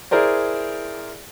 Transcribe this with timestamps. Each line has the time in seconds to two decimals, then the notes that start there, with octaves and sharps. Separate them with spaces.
0.11 E4 G#4 A#4 C5 D5